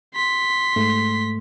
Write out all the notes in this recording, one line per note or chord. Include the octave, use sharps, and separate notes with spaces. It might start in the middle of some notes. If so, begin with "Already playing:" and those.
C6 B6
G#2 A3